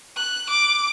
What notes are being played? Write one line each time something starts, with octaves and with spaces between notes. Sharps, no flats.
F#6
D6